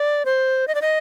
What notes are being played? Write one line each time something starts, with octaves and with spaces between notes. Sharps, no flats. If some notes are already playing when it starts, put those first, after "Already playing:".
Already playing: D5
C5
D#5
D5
D#5